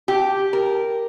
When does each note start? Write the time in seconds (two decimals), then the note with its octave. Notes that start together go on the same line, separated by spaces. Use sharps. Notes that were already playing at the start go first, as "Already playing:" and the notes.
0.08 G4
0.53 A#4